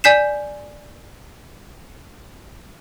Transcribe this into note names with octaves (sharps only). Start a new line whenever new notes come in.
D5 G#5 G6 B6 C7 E7